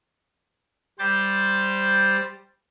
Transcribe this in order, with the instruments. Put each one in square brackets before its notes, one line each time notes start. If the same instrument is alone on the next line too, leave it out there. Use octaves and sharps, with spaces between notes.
[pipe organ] G3 G4 C5 G5 A6